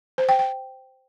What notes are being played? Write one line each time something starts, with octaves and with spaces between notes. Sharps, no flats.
C5
G5
G5